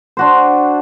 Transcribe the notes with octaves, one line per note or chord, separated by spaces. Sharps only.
D4 F#4 C5